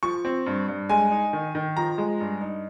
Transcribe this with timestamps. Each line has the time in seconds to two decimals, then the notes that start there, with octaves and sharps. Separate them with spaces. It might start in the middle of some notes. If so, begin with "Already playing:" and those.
0.03 F3 C#6
0.25 C4
0.46 G2
0.68 G2
0.89 G#3 G#5
1.11 D#4
1.33 D#3
1.55 D#3
1.77 F3 A#5
1.98 G#3
2.20 G2
2.41 D#4